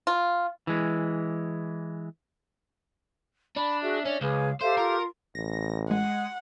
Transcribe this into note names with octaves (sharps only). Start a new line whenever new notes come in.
F4
E3 G#3
D4 B5
F#4 G#4 E5
C#4 D4 D5
C#2 G#4 B4 F5
G4 A4 C5 E5 F5
F4 A#4
A1 A#6
G#3 F#5